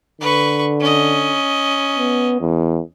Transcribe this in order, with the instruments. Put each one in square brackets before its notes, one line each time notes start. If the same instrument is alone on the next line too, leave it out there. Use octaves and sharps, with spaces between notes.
[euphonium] D3 [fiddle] B4 C#6
[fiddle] C#4 D#5
[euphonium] B3
E2